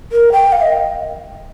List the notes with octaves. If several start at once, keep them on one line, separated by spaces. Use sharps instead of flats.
A#4
G5
F5
D#5